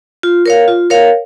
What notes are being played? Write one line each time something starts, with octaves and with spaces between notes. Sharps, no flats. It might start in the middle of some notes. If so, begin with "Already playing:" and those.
F4
A#4 C#5 F5
F4
A#4 C#5 F5